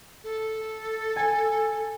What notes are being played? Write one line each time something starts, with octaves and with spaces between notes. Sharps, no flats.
A4
G#5